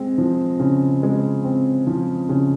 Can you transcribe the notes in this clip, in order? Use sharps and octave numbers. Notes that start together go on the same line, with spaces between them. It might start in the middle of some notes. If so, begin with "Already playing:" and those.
Already playing: G#3 C4
F3
C#3
G#3
C4
F3
C#3